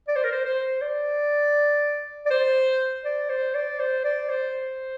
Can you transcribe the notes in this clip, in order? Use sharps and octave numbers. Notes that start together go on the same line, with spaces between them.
D5
C5
A#4
C5
C5
D5
D5
C5
D5
C5
D5
C5
D5
C5